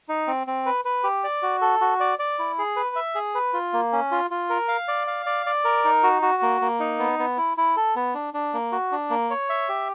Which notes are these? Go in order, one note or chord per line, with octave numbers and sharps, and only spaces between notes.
D#4
C4
C4
B4
B4
G4
D5
F#4
A4
F#4
D5
D5
E4
G#4
B4
E5
G#4
B4
F4
A#3
C#4
F4
F4
A#4
F5
D5
F5
D5
D5
A#4
D#4
F#4
F#4
A#3
A#3
D#4
B3
B3
E4
E4
A4
B3
D4
D4
A#3
F#4
D4
A#3
C#5
E5
G4